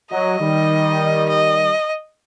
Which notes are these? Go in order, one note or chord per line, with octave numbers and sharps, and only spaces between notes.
F#3 D#5
D#3 G3
D#5